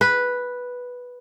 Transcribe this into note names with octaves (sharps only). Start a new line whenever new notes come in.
B4